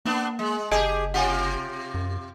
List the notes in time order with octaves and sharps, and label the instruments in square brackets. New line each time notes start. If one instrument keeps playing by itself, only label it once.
[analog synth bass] A#3 [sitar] B3 D4
[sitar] G#3
[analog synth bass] F#1 [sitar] G4 G#4 [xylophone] D#5 G#5 A5
[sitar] C3 F4 G4 [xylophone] F#5 G#5
[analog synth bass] F#2